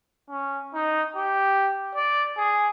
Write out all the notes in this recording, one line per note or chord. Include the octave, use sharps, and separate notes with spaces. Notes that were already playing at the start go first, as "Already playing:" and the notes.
C#4
D#4
G4
D5
G#4